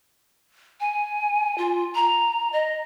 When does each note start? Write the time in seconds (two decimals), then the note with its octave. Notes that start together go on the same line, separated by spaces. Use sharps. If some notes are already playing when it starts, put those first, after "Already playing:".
0.80 G#5
1.58 F4
1.95 A#5
2.53 D#5